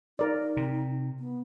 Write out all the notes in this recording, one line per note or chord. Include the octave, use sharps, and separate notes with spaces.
D#4 A#4 D5
C3
B3